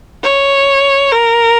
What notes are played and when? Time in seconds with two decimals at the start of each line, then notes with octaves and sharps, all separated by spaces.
0.23 C#5
1.12 A#4